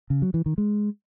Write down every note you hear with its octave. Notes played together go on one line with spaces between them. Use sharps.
C#3
F#3
E3
D#3
G#3